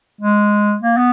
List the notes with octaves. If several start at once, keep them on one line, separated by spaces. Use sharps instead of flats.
G#3
A#3
B3